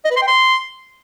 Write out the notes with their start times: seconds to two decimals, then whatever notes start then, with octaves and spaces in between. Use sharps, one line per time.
0.05 D#5
0.11 B4
0.16 C6
0.22 G5
0.27 C6